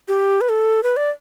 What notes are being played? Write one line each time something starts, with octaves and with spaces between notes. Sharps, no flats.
G4
B4
A4
B4
D5